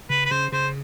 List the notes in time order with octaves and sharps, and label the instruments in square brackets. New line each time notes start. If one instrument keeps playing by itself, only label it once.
[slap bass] C#3 [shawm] B4
[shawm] B4
[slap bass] C#3 [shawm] C5
[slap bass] C#3 [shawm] C5